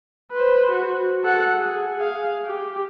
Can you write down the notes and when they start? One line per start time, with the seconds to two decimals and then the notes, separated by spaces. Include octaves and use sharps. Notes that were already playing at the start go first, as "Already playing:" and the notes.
0.32 B4 C5
0.71 F#4
1.24 A4 F#5
1.56 G#4
1.97 G#4 F5
2.45 G4